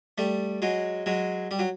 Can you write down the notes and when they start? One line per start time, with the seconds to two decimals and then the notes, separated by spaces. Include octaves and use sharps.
0.18 G3 A3
0.62 F#3 G#3
1.06 F#3 G#3
1.51 G3
1.59 F#3